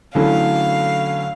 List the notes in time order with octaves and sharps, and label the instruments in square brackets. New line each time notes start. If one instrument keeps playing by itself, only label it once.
[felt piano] D3 F#3 A3 C#4 E4 [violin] F5